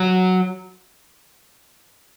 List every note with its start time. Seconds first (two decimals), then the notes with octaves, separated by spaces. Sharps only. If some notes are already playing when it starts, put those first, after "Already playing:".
Already playing: F#3